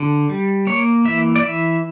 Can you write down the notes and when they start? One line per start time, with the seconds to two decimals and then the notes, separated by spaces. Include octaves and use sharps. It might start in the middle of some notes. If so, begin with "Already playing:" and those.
Already playing: D3
0.29 G3
0.67 A#3 C#5
1.05 E3 E5
1.36 D5
1.43 E3 E5